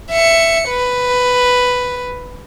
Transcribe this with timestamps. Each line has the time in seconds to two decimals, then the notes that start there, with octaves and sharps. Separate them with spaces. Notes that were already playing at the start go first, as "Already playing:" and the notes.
0.11 E5 C#7
0.69 B4